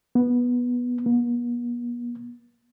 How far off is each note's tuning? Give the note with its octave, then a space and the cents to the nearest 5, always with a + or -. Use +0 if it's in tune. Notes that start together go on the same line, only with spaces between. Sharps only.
B3 -10
B3 -45